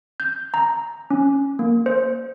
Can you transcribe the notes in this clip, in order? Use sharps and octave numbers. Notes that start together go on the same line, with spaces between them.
G6
A#5
C#4
A#3
C5